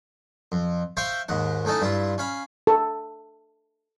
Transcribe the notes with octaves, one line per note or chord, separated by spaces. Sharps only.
F2
C5 E5 F5 G5 C#6
D#2 G#2 F#5
A2 A3 C#4 D#4 A5
G2 E4 F4
C#4 F5 B5
A4